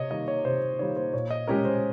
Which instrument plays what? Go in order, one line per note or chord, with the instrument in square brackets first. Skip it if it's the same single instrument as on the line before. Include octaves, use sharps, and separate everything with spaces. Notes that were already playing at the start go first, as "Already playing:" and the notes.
Already playing: [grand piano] C3 [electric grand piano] C#5 D#5
[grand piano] D#3 G3 A#3 [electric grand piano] D#5
[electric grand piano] C#5
[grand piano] C3 [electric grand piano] C5
[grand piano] D#3 G3 A#3 [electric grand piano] C#5
[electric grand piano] C5
[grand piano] A#2 [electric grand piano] C#5
[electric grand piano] D#5
[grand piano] G#3 C#4 G4 A#4 [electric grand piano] C#5
[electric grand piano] C5